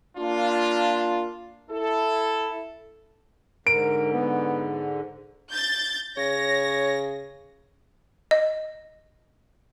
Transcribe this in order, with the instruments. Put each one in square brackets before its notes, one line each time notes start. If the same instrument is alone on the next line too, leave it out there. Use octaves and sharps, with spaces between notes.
[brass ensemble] A#3 D4 F4
E4 A4
[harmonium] G#2 D3 [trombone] A#4 [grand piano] D7
[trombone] B3
[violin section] G6 A6
[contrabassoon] C#3 [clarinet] C#5 [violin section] A#6
[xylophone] D#5